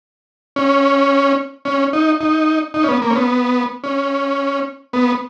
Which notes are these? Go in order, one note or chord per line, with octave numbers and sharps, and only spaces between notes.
C#4
C#4
D#4
D#4
D#4
C#4
B3
A#3
C#4
B3
C#4
B3